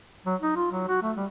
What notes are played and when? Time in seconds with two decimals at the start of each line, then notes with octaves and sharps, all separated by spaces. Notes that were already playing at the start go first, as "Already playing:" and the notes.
0.26 F#3
0.41 D#4
0.56 F4
0.72 F#3
0.88 F#4
1.02 A3
1.17 G3